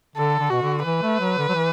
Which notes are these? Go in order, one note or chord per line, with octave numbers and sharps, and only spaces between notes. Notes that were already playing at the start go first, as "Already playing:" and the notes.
D3 A4
D3
B2 F#4
D3
E3 B4
A3
F#3
D3
F#3
E3